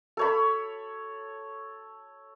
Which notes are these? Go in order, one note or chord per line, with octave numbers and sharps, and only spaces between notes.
A4 C#5 B5